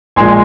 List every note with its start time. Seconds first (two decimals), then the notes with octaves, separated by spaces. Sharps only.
0.16 A#1 A#2 G#3 G#5 C6